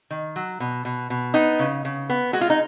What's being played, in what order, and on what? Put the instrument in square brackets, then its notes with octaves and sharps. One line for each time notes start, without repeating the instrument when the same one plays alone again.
[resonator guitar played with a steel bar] D#3
F#3
B2
B2
B2
B3 D#4
C#3
C#3
B3
G#3 F#4
F4
D#4